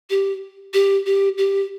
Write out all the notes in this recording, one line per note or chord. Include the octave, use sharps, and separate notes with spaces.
G4
G4
G4
G4